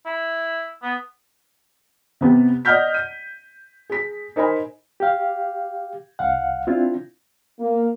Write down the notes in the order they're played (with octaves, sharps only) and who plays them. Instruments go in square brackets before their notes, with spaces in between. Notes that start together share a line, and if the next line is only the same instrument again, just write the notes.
[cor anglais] E4
B3
[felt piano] C3 B3 G4
D5 D#5 F#5 F6 G6 B6
D#7
G#4 B6
D#4 A#4 C5 D#5 G#5 B5
[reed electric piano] G4 F5
C2 F5 F#5
C4 D4 E4 F4
[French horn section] A#3